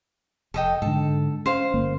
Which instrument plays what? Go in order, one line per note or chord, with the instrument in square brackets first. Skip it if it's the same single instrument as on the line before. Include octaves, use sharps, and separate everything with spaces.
[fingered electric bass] F1 [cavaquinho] A4 D#5 G5
[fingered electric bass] G#2 D3 [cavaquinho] A4
[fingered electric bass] C#4 [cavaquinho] C5 F5
[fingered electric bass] G1 A#3